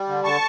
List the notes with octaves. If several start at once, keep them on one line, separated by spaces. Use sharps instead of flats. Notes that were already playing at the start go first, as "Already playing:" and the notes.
Already playing: G3
D3
D3 A5 C#6